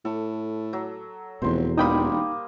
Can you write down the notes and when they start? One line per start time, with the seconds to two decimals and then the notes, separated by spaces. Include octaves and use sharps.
0.05 A2 A4
0.73 F#3
1.42 F1 E2 B2 C5 C6
1.78 E1 G3 A#3 D#4 G5 B5 D#6